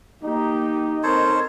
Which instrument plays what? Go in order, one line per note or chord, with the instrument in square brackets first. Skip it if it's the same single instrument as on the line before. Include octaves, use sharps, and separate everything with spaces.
[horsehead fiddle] A#3 G4 [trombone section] D#4
[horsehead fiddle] C4 A#4 [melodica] A4 C5 C#5